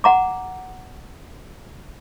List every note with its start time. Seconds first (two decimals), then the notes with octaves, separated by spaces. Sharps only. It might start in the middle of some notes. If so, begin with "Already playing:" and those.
0.04 F#5 A#5 D6